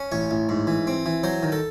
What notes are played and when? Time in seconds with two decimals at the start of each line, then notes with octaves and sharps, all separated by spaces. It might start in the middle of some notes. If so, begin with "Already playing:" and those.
Already playing: C#4
0.12 A1 C#5
0.31 A1
0.49 G#2
0.67 E3
0.87 C4
1.06 E3
1.24 F#3 C5
1.43 D#3
1.52 A4